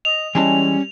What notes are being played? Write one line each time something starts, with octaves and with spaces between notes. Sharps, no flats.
D#5 F7
E3 G3 G#3 C#4 A5